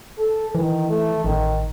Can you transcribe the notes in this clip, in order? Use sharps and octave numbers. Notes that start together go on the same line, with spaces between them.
A4
D#3 E3
A3
A1 D#3